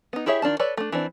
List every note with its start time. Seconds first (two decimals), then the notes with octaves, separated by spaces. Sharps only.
0.13 B3 D#4
0.26 E4 G4 G#4 C#5 E5
0.42 D#3 D4 F4 A5
0.59 A4 B4 C#5 D5
0.77 A3 D4
0.92 E3 C4 D4